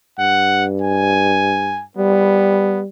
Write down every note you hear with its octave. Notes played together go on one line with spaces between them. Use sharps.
G2 F#5
G#5
G3 B3